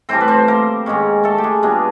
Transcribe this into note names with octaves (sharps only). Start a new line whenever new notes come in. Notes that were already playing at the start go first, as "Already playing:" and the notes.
A2 E3 G3 C4 C5
B4
C4 C5
A#3 A#4
G#2 D#3 G#3 C#4
A3 A4
G4
G#3 G#4
A#2 G3 G#3 B3 D4 G#4